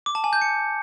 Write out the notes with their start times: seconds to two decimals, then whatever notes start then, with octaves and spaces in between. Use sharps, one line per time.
0.06 D6
0.15 A5
0.24 G#5
0.33 G6
0.41 C#7